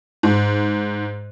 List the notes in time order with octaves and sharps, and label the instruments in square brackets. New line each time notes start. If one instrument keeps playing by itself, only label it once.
[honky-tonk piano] G#2